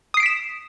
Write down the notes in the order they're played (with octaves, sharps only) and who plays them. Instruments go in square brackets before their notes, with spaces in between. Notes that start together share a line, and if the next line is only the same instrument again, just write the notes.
[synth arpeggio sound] D#6
C7
D7
B6
E7